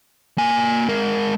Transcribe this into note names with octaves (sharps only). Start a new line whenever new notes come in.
A#3 G#5
G#3 A#4